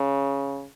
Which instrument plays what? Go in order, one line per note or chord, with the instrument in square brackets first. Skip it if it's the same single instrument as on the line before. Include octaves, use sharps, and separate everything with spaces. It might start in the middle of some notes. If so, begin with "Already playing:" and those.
Already playing: [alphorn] C#3